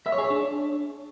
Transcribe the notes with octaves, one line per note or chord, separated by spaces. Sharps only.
E5
C#5
G#4
C#5
D4